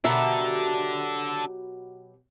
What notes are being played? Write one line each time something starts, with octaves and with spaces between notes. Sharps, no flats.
B2 F#3 D4 G4 A4 A#4 E5